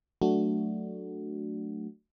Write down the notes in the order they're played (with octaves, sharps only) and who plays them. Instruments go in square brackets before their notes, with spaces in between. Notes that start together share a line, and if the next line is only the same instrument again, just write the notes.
[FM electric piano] F#3 A3 D4 F#4